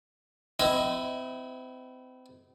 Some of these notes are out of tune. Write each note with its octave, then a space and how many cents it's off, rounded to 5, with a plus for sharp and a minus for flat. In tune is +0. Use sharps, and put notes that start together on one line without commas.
C4 -35 E4 +0 D#5 +0